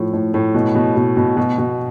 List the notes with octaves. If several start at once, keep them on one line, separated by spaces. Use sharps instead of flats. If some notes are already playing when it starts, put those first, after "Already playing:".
Already playing: A2 F3
A2
A2
B2
B2
B2
B2
B2
B2